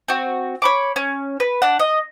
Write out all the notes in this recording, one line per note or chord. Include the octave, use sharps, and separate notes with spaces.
C4 F#4
C#5 B5 D6
C#4
B4
D4 F#5
D#5